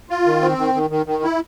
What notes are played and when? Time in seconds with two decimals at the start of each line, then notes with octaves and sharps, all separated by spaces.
0.10 F4
0.26 D#3
0.41 C4
0.58 D#3
0.74 D#3
0.90 D#3
1.06 D#3
1.23 E4